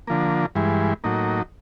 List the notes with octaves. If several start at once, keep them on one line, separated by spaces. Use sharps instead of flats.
D3 F3 A#3
G2 E3 G#3
A2 F#3 A#3 D#4